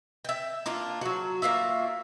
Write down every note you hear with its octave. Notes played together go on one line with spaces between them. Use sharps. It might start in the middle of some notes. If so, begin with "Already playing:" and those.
E5 G5
A#3 D4 F4
F#3 F#4
A#3 F4 F#4 E5